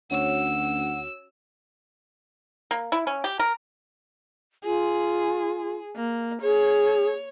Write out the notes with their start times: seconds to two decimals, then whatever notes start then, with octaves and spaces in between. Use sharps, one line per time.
0.11 D2 C#4 F#4 C#5 F#5 E6
2.71 A#3
2.92 E4
3.07 C#4
3.24 G4
3.39 A#4
4.64 F4 G#4
5.96 A#3
6.42 G#4 C#5